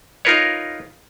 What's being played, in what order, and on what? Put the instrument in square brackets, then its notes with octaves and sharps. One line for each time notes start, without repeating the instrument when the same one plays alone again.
[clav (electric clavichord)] D#4 F4 A#4 B4 C#5